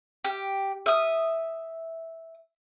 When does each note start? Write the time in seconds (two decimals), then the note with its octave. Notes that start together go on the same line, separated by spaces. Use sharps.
0.24 G4
0.86 E5 D#6